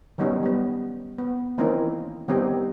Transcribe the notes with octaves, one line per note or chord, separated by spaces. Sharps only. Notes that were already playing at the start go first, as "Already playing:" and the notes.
D#3 F#3 G3 B3 C#4 D#4
G3 B3
B3
D#3 E3 A#3 C4 C#4 D#4
D#3 G3 B3 C4 D#4 G4